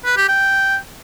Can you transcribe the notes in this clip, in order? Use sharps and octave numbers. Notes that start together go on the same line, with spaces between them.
B4
G4
G5